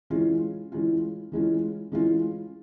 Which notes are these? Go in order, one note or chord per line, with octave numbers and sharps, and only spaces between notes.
E3 G#3 C#4 F4
E3 G#3 C#4 F4
E3 G#3 C#4 F4
E3 G#3 C#4 F4